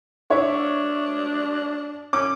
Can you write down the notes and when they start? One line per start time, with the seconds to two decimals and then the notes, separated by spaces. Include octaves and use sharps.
0.30 D4 C#5 E5
2.13 C#4 D6